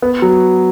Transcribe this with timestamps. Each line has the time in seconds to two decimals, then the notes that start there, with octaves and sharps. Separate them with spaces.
0.02 B3
0.22 F#3